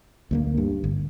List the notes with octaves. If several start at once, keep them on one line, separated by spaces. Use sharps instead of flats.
D2 A3 A#3
G2
G1